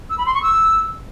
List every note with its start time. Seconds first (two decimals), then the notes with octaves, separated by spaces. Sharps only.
0.10 E6
0.18 B5
0.26 C6
0.34 C#6
0.42 E6